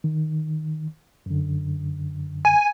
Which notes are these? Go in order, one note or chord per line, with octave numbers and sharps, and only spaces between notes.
D#3
F#2 D3
G#5